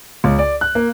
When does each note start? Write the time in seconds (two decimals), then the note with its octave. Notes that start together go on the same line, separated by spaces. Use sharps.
0.24 C#2
0.39 D5
0.61 F#6
0.75 A#3